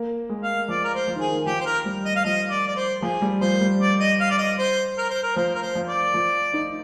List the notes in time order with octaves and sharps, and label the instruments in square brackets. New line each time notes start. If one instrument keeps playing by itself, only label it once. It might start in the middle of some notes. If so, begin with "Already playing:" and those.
Already playing: [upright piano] A#3
G#3
[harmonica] F5
[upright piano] F3 [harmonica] D5
[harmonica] A#4
C5
[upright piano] F3
D#3
[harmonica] G#4
[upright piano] D#3
[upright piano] F3 [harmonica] G4
[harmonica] C5
A#4
[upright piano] G3
[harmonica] D#5
F5
[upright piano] F3 [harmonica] D#5
[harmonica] D5
D5
C5
[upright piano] F3 [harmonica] G#4
[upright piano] G3
[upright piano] F3 [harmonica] C5
[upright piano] G3
[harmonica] D5
D#5
F5
D5
D#5
C5
A#4
C5
A#4
[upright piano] F3 [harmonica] C5
[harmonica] A#4
C5
[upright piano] F3
[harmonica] D5
[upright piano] F3
D#4